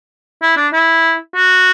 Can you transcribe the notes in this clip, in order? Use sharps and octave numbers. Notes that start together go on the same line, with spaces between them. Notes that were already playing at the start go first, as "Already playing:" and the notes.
E4
D4
E4
F#4